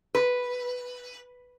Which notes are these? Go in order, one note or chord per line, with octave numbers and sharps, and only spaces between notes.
B4